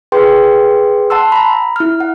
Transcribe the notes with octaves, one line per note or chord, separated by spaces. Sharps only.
G#4 B4 G5 C6
F#5 A5 C6 E6
A#5 B5
E4 F6
F#5